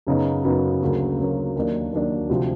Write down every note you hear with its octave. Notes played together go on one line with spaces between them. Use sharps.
F#2 C#3 F#3 B3 D#4
F#2 C#3 F#3 B3 D#4
D2 C#3 F#3 A#3
D2 C#3 F#3 A#3
D#2 D#3 F#3 A#3 D4
D#2 D#3 F#3 A#3 D4
D2 C3 F3